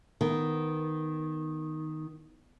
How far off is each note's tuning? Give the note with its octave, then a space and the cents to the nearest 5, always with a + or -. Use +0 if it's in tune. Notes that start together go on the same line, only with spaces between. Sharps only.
D#3 +0 B3 +0